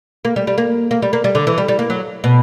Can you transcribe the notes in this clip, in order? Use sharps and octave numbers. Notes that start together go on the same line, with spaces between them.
A#3
G3
G3
A#3
A#3
G3
A#3
G3
D3
E3
G3
G3
A#3
F#3
B2